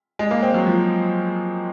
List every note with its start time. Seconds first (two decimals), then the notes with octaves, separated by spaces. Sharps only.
0.19 G#3
0.31 A#3
0.43 C4
0.54 F#3
0.67 F3